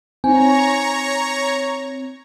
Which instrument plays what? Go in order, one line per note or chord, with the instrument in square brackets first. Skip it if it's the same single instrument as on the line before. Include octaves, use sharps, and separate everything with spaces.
[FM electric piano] C4 [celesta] D#4 G#5 [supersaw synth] C#5 A#5 C#6